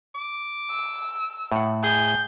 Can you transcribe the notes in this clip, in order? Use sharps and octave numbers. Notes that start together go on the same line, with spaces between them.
D6
E6
A2 F#5
G#4 G6